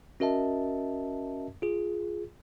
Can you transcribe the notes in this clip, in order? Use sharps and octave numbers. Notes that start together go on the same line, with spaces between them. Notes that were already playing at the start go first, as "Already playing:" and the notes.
C#4 F#4 A#4 D#5 E5 A5
F4 G#4